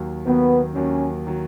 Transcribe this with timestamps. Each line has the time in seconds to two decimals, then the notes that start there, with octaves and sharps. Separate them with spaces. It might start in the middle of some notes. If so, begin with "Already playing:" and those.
Already playing: D#2 D#3 F#3
0.26 D#2 D#3 F#3 B3
0.74 D#2 D#3 F#3 C#4
1.27 D#3 F#3